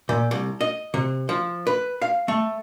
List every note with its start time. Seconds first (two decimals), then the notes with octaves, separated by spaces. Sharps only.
0.09 A#2
0.31 C2
0.61 D#5
0.94 C3
1.29 F3
1.67 B4
2.02 F5
2.28 A3